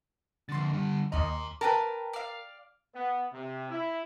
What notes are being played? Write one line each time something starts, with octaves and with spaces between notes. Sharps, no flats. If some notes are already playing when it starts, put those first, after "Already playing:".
F2 D3 C6 A6
D3 G3
D#2 D#5 A#5 C6
A#4 B4 G5 A5
D5 F5
B3
C3
E4